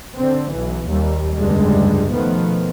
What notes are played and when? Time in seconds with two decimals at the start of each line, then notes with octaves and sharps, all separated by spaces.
0.17 D3 C4
0.52 B1 E3
0.88 D#2 G3
1.36 F1 C#2 G2 D3 G3 G#3
2.13 B2 D#3 F3 A3 B3